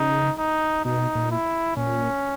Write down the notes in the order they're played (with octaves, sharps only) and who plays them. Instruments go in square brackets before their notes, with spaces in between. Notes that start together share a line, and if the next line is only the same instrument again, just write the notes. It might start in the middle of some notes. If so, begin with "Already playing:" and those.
Already playing: [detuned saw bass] C#3 [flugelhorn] D#4
[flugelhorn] D#4
[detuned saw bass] B2 [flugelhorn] D#4
[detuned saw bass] A#2
[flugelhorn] E4
[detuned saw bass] A#2 [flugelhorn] C#4